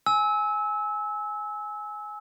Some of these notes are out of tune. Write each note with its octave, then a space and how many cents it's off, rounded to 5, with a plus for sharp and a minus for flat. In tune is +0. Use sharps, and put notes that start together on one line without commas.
G#5 +10 E6 -25